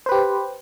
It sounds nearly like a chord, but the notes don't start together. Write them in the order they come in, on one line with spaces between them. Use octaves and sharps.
C5 B4 G4